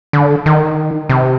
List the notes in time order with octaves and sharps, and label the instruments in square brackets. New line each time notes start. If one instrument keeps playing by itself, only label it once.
[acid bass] D3
D#3
C3